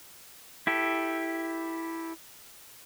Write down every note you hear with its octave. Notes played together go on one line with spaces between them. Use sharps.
E4 G4 A4